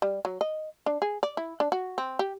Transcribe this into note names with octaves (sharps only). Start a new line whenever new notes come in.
G3
F#3
D#5
D4
G#4
D5
E4
D4
F#4
C4
G4